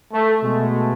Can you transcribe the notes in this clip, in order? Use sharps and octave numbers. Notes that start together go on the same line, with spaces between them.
A3
B2 G#3 A3